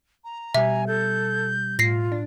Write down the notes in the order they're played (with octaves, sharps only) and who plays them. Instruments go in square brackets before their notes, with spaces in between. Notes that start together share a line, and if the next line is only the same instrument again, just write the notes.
[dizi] A#5
[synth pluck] B2 G3 [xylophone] E5 [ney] G#5
[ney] A4 [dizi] G6
[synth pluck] A2 [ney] F4 [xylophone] A#6 C7
[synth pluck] D4